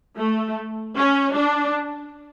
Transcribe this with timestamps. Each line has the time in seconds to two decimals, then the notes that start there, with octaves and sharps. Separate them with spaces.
0.17 A3
0.96 C#4
1.34 D4